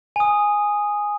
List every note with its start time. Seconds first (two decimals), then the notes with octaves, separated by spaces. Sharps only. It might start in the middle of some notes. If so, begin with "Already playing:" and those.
0.16 G#5 D#6